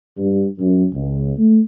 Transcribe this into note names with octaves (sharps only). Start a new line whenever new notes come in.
G2
F#2
C#2
A3